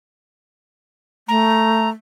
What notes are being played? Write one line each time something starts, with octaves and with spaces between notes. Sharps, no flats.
A3 A#5